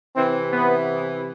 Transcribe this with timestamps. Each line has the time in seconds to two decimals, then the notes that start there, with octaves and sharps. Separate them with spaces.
0.16 C3 E3 C4
0.52 B3